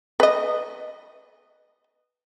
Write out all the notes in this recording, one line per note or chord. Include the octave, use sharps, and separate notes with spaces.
B4 D#5